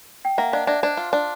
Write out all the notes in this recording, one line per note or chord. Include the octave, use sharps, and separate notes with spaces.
G5
A#3 E5 F#5
D4 D#5 F5
D4 D5 E5
D4 C5 D5
F4
D4